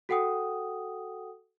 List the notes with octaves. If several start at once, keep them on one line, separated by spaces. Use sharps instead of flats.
F#4 A4 F#5 G5 D#6